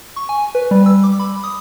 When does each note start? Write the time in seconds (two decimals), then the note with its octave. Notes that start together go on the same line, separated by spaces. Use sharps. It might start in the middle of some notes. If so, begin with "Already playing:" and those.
0.16 C#6
0.29 G#5
0.55 B4
0.71 G3
0.86 E6
1.03 D6
1.20 B5
1.44 D#6